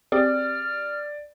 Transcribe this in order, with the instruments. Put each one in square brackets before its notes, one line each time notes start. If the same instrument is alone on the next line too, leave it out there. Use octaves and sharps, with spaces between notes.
[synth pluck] C4 G4 G#4 [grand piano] D5 [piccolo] F6